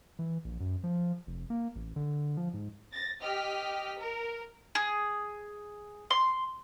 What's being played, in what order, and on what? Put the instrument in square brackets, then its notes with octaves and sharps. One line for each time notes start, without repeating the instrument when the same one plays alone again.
[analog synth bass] E3
A#1
F#2
F3
F1
A#3
A1
D3
F3
G#2
[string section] A6 A#6
G4 D#5 F6 B6
A#4
[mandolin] G#4
C6